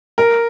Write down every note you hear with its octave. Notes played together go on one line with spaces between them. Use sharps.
A#4